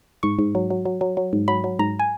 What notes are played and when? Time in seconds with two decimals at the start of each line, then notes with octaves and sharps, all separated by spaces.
0.23 G#2 C#6
0.39 G#2
0.55 F#3
0.70 F#3
0.85 F#3
1.01 F#3
1.17 F#3
1.33 G#2
1.48 F#3 B5
1.64 F#3
1.79 G#2 A#5
1.99 G#5